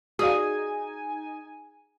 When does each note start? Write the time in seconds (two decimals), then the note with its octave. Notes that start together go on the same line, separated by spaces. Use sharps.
0.19 D#4 F#4 G#4 D5 F5 G#5